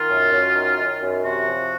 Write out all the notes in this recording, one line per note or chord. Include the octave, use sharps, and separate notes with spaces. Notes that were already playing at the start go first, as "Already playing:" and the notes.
Already playing: D#3 F4
F#2
F#2
D#3
D#3
F#2
C3 F#4
F3